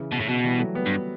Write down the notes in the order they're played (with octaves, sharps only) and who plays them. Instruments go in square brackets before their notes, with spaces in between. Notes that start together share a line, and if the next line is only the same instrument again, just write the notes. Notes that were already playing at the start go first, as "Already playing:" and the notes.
Already playing: [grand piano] C#3 E3
[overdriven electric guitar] B2
A2
B2
[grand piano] E3 G3
F#3 A3
G3 B3
[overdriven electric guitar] G2